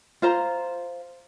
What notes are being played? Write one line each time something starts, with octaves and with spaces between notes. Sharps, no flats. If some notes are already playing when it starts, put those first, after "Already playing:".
F4 C5 A#5